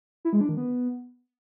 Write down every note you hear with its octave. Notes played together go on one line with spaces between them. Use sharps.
E4
G#3
D4
D#3
B3